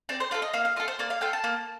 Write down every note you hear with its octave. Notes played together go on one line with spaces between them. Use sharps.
C4 D5
C5
F4 A4 D5
D#5
A#3 F5
F5
F4 A4 D#5
C5
A#3 D5
F5
F4 A4 G5
A5
A#3